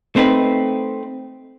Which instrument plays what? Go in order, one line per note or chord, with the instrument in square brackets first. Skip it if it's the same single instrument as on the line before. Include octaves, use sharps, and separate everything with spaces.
[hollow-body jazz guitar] A3 C4 D#4 B4